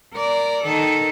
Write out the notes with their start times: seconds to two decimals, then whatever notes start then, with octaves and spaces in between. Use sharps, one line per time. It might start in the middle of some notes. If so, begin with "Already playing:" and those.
0.14 A#4 D5
0.63 D#3 A4